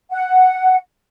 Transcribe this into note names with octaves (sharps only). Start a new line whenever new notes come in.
F#5